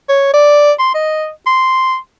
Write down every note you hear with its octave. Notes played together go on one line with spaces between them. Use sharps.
C#5
D5
C6
D#5
C6